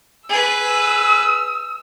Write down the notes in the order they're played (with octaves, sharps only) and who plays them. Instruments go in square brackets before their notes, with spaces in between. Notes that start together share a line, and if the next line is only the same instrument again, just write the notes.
[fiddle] G#4 B4 [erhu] E6